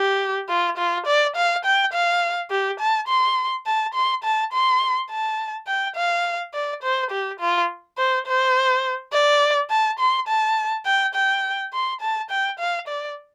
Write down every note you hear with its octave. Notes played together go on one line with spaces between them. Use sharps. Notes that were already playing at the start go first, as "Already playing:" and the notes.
Already playing: G4
F4
F4
D5
F5
G5
F5
G4
A5
C6
A5
C6
A5
C6
A5
G5
F5
D5
C5
G4
F4
C5
C5
D5
A5
C6
A5
G5
G5
C6
A5
G5
F5
D5